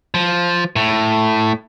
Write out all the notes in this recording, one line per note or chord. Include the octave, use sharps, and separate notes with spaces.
F3
A2